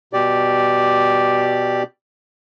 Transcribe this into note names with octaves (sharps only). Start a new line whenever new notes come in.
B2 G4 D5